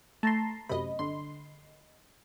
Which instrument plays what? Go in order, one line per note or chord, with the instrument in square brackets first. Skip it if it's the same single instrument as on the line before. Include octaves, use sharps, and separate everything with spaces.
[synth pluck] A3 [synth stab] A5 A#5 C6
[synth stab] F#2 C3 [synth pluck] D#5 B5
[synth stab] G1 D3 C6